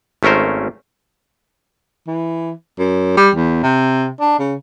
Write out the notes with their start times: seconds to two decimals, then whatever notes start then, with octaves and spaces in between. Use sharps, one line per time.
0.23 G#1 A3 C#4 A#4 C5
2.07 E3
2.79 F#2
3.17 G3
3.35 E2
3.63 C3
4.20 D4
4.39 C#3